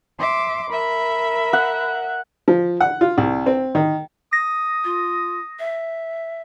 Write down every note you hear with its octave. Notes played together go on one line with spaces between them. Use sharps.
E5 C6 D6
A#4 E5 B5
F#5
F3
F#5
F4
C2
C4
D#3
D#6 A#6
F4
E5